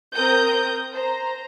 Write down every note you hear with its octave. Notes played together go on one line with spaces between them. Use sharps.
C4 A#4 D#6 G6
C5 A#5